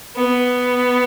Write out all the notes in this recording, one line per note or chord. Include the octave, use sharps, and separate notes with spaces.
B3